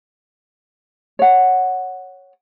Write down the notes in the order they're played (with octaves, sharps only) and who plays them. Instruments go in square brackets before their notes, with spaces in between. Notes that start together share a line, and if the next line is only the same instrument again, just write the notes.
[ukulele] C#5 F#5